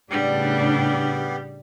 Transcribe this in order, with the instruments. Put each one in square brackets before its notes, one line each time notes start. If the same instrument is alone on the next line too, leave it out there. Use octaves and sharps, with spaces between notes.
[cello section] A2 C#3 D4 [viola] G3 [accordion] B3 G4